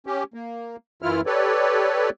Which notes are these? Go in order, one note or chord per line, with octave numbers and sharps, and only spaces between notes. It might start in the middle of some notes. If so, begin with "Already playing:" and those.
C#4 G4
A#3
F#2 E3 E4 F4 F6
G4 A4 B4 C#5 D5